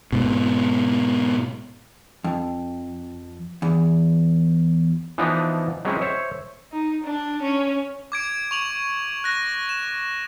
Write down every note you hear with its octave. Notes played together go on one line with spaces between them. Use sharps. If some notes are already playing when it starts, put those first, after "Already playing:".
G#2 B2
F2
E2
E3 F3 B3 D4 D#4
F#3 G#3 C4 C#4 E4
C5 C#5 E5
D#4
D4
C#4
D6 G#6 D7
C#6 F7 F#7
F#6 A#6
E7